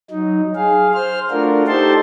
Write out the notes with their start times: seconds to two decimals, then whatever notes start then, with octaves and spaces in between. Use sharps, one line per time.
0.11 F#3 D#4
0.56 G#4 F5
0.94 C5 F6
1.31 A3 D4 F4 F#4 A#4
1.68 D#4 G4 A4 C5 A5 C6